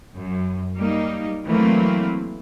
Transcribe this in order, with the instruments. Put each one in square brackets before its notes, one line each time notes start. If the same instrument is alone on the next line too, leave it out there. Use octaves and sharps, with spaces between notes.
[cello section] F#2
G3 A#3 D#4
E3 F#3 A3 A#3 C4